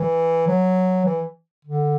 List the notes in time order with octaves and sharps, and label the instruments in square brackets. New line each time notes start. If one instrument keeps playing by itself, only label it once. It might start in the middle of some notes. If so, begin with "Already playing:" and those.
Already playing: [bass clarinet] E3
F#3
E3
D3